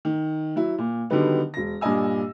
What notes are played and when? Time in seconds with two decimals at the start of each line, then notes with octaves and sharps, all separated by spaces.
0.05 D#3
0.56 F#3 E4
0.78 A#2
1.10 D3 D#3 F#3 G3 B3 D#4
1.54 E1 A#6
1.81 G2 A#2 D4 D#5 G#5 E6